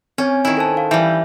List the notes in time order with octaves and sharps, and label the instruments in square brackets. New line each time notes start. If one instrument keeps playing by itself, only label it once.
[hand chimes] C4 C#5 G#5 [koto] C#4
[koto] D#3 E4 [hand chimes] G#5
[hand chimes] A4 C5 A5
F5
[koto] E3 G3 [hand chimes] E5 G6